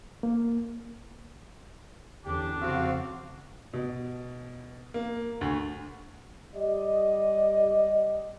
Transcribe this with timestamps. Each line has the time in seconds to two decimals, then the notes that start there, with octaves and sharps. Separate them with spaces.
0.23 A#3
2.26 E2 D3 C#4 D4 G4
2.62 F2 C#3 C4 F#4 F5
3.73 B2
4.94 A#3
5.41 D2
6.55 G3 G4 D5 D#5